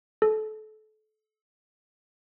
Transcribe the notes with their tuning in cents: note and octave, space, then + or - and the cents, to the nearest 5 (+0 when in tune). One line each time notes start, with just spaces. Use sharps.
A4 -30